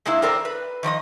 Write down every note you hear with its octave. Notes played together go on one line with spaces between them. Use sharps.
C3 G#3 A#3 D4 E4
E2 C4 A4 A#4 D5 A#5
B4
D#3 F3 D5 D#5